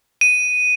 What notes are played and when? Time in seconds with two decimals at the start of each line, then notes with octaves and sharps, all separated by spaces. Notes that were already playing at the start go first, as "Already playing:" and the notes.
0.21 D#7